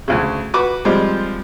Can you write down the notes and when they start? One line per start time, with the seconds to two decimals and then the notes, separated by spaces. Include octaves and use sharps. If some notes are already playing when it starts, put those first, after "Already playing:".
0.08 D2 C#3
0.54 F#4 B4 D6
0.85 F3 G3 G#3 C4